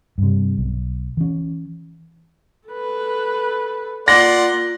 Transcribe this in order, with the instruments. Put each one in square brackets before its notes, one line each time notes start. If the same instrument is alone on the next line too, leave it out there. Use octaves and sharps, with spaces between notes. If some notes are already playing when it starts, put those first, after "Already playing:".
[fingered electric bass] G2 C3
B1
E3 C#4
[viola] A4 B4
[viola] A#3 F4 [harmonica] D5 F#5 C6 [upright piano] A#6